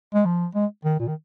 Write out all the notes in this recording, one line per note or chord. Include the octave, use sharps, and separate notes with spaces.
G#3
F3
G#3
D#3
A#2
D#3